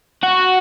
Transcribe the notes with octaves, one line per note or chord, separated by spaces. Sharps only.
F#4